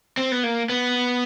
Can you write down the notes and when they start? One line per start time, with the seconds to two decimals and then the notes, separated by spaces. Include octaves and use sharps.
0.17 C4
0.32 B3
0.43 A#3
0.69 B3